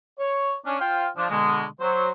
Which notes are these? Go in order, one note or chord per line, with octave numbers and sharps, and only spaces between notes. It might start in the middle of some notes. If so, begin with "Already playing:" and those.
C#5
C#4 D4
F4 C5 F5 G5
F3 D4
B2 D3 G#3
F#3 C5